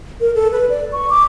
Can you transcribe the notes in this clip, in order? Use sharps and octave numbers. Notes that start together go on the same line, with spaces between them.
A#4
A4
B4
D5
C#6
D6